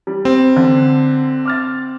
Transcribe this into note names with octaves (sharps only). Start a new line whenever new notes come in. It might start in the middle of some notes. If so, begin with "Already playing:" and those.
G3
C4
D3
D6 F6 A6